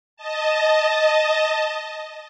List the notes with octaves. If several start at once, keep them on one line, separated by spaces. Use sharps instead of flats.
D#5 A5